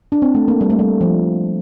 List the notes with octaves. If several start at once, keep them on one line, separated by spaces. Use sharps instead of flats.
D4
C4
A3
A#3
G3
A3
G3
F3